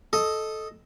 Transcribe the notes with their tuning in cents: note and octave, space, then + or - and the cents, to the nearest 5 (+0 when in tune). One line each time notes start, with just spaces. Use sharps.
A4 -10 D#5 +0